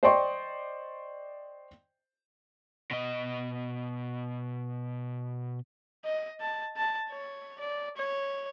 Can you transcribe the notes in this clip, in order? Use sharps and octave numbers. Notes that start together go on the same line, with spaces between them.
C5 D5 D#5 G5 C6 C#6
B2 D#5
D#5
A5
A5
C#5
D5
C#5